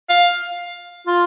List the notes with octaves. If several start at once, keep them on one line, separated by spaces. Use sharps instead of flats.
F5
F4